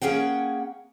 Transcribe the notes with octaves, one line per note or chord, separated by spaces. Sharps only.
A#3 C#4 G#4 F#5 G5